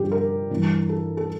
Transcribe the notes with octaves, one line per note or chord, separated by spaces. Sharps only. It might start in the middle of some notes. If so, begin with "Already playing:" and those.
Already playing: G2 D3 F3 G4
A#4
G2 E3
A4
A4